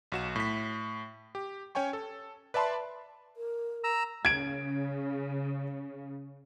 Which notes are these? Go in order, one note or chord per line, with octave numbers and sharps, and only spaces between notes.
B1 F#4 E7
A2 B6
G4
C#4 C#5 G5 G#5 C#6
A4
B4 D5 E5 A5 B5 C6
A#4
A#5 E6
C#3 G#6 D7